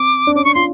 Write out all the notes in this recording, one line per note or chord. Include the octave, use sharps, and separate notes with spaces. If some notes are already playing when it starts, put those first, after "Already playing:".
Already playing: C4 D6
D4
C#4 D6
D4 C#6
F4 C6